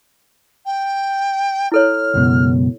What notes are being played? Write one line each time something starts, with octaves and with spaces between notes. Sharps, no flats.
G5
E4 A4 C#5 F6
C#2 F#2 B2